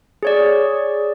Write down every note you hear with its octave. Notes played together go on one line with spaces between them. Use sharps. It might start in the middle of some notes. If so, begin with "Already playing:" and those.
G#4 C#5 D5